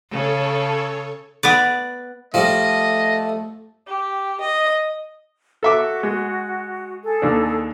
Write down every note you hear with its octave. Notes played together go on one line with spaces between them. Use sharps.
C#3 A4 C#5
B3 B4 D5
F3 G3 A3 D#5
G4
D#5
F#4 A4 E5 D6
G#3
G#4 A4
D#2 D4